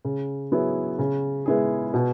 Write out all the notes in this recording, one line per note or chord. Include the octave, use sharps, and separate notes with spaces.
C#3
F#3 B3 E4 G#4
C#3
G#3 B3 E4 G#4
B2